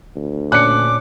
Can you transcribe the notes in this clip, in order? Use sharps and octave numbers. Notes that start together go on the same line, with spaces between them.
D2
A#2 C#4 D4 D6 F#6 C#7